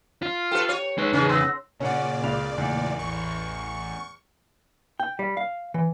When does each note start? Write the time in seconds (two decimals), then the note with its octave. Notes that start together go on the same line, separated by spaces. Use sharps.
0.22 F4
0.51 G4 A4 B4 G5
0.69 C#5
0.98 G#3 D#4 B4 C#5 F#6
1.13 E2 C#3 C#4 G#4
1.29 B3 C6 E6 A#6
1.80 A#2 C#3 C#4 D5 F#5
2.23 C#2 F4 F7
2.58 E2 C#3 A3 A#3
2.99 A1 C#6
5.00 G5
5.19 G3
5.37 F5
5.74 E3